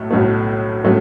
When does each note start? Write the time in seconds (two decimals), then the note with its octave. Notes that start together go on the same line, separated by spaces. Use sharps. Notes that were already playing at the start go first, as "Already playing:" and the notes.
Already playing: B1 A2 A3
0.11 B1 A2 F#3 A3
0.84 A2 F#3 A3